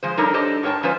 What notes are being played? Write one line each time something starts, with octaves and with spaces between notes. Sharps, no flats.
F3 G#3 C5
G3 D4 D#4 A4 A#4 C#5
D4 G4 A4 C5 D#5
G#2 A#4 C#5 G5 A5
F3 G#3 C#4 F4 B4 C5